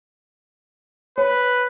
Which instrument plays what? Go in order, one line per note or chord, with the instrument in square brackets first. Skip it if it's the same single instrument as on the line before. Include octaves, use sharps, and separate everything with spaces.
[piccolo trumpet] B4 [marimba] C#5